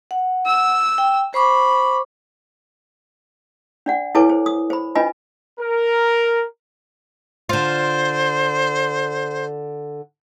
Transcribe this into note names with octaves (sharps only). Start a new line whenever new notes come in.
F#5
E6
G5
C5 B5 C#6 D6
D4 D5 F#5
E4 A4 B4 C#5 G#5 D6
C5
D#6
C5 B5
D4 F4 B4 D#5 G#5 B5
A#4
D3 F4 C5